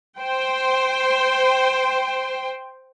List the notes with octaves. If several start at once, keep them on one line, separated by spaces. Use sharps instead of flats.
C5 G5 C6